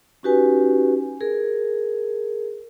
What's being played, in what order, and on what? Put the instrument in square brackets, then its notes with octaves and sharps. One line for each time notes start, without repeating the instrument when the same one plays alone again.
[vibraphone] C#4 D#4 F#4 G4 B4 G#5
G#4 A#4